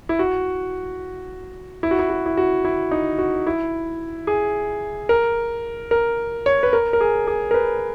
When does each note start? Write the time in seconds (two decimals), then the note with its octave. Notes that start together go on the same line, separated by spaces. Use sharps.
0.09 E4
0.19 F#4
1.83 E4
1.91 F#4
1.99 E4
2.10 F#4
2.26 E4
2.37 F#4
2.65 E4
2.91 D#4
3.18 F#4
3.47 E4
4.27 G#4
5.09 A#4
5.91 A#4
6.46 C#5
6.63 B4
6.73 A#4
6.93 A#4
7.01 G#4
7.27 G#4
7.51 A#4
7.54 B4